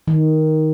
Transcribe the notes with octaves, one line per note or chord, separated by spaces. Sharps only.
D#3